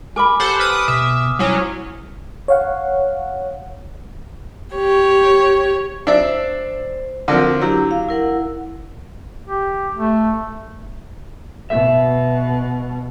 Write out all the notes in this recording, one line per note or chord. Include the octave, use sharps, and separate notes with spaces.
A#4 G#5 B5 D6
G4 A4 C5 F#5
B4 D6 D#6 F6
B2 E5 D#6
F#3 G3 C#4 E4 C5
C#5 F5 F#5
G4 C#5
D4 C5 E5
D3 F3 C4 A#4
F#3 D4 E4 G4
F5
E4 A#4 F#5
G4
A3
B2 E5